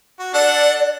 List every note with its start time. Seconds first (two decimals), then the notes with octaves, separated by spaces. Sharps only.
0.19 F#4
0.34 D4 A4 D5 F#5